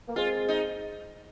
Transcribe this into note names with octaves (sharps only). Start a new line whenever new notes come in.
A#3
G#3 C4 F4
D#4